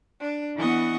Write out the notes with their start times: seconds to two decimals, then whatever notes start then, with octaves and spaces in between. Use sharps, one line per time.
0.20 D4
0.57 E3 B3 D#5 F#5 C#6